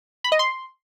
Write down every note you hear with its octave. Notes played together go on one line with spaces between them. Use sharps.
B5
D#5
C6